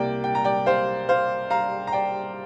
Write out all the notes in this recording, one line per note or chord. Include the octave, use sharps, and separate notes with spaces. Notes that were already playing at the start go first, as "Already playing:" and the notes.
Already playing: C2 C3 G3 A#3 D5 G5
G5
A#5
D5 G5
C5 F5
C5 F5
F5 A#5
A#5
D5 G5